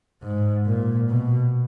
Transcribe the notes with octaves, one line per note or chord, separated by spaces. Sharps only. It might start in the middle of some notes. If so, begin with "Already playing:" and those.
G#2
A#2
B2